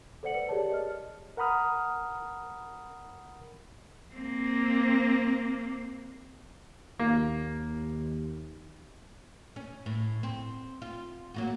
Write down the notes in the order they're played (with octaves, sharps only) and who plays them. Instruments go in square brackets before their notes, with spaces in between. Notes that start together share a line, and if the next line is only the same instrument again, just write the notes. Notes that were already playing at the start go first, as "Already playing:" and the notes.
[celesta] A4 C5 D5 F#5 C#7 F#7
B4 C#7
G4 G#4 A#4 C#5 D5 A5
D#5 F6
[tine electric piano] A#4 F#5 A#5 B5 D#6 F6
[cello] A#3 C4
[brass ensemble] D#2 [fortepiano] A#3
[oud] C#4
A2
C4
F4
F#3 A#3 F#4